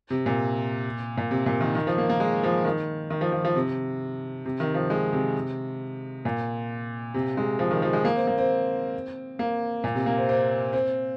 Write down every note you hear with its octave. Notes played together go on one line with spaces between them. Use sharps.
C3
A#2
A#2
C3
A#2
D#3
D#3
F3
A#3
A#3
G#3
F3
D#3
D#3
F3
F3
F3
C3
C3
D#3
F3
G#3
C3
A#2
C3
G#3
F3
D#3
F3
G#3
A#3
C4
A#3
C4
A#3
A#2
C3
A#3
C4
C4
C4